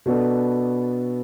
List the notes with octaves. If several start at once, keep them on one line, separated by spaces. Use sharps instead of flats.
B2 B3 D4 A4